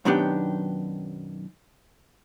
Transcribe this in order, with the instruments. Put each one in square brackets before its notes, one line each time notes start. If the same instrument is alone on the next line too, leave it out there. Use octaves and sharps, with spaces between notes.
[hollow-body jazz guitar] B1 F#2 D#3 B3 D4 G4